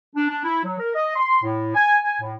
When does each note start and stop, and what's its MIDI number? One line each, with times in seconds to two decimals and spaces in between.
0.15 0.27 62
0.29 0.41 62
0.44 0.63 64
0.63 0.76 54
0.78 0.91 70
0.94 1.15 75
1.16 1.40 84
1.43 1.74 45
1.75 1.97 80
2.04 2.17 80
2.21 2.33 45